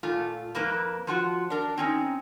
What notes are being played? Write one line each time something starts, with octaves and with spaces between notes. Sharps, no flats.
A#2 A3 F4
F2 A#3 E4 A#4 B4
F3 F4 F#4
D4 A#4
C4 C#4 D#4